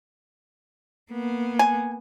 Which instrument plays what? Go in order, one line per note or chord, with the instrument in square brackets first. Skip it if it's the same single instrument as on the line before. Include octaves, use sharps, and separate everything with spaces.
[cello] A#3 B3
[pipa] G#5